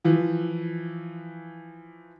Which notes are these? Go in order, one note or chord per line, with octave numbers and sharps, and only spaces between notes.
E3 F3